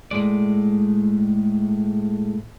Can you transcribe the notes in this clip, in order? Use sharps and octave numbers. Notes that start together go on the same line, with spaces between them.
A2 G#3 D5